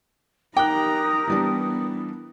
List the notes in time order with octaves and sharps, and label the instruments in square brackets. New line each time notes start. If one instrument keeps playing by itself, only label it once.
[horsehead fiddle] D#4 A#5 [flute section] G4 A#4 D#6 [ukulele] G5 [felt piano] D6 F#6
[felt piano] E3 G3 D4 [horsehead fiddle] B3